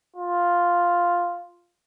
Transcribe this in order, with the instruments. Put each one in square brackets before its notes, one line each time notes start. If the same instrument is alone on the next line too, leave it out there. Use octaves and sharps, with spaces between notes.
[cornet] F4